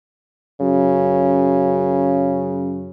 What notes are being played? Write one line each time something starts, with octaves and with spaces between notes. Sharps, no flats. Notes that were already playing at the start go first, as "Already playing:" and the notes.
F#2 C#3